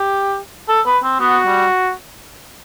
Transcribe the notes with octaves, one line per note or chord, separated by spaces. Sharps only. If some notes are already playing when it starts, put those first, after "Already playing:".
Already playing: G4
A4
B4
C4
B3 F#4
G3